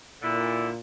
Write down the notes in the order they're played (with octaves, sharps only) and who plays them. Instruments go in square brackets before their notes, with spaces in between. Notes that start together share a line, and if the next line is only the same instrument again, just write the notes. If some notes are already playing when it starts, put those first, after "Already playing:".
[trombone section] A#2 [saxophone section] D3 E4